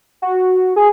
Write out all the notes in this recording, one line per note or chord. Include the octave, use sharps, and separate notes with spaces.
F#4
G#4